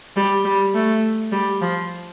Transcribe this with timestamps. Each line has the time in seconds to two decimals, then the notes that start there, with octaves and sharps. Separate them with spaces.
0.16 G3
0.45 G3
0.74 A3
1.32 G3
1.61 F3